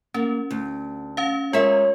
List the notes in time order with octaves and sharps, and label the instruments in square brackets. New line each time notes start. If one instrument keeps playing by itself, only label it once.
[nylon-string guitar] A#3 [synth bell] C#4
[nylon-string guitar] D2
[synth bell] C#4 F5
[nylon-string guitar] G#3 A#4 E5 [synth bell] F4 [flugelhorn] C#5